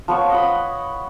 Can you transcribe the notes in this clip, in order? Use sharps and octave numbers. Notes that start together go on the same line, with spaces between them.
F3 B3 C#5
D#5 F#5 B5